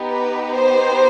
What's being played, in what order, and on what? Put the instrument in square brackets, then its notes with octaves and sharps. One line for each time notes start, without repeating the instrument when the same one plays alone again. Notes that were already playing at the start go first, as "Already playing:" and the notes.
Already playing: [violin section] B3 D#4 G4
B4
C5